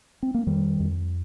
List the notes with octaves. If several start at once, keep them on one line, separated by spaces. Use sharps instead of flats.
C4
A#3
F2 D#3 G3
F2